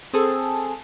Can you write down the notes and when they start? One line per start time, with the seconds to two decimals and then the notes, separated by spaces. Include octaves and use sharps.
0.13 C4 G#4 A4